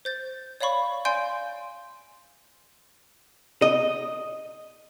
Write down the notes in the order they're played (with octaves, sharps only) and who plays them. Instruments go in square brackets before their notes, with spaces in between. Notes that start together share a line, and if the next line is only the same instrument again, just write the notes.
[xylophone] C5 G6 A6
C#5 D5 F5 B5 C#6
D5 F5 G#5 C6 G6 D7
[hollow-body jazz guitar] D#5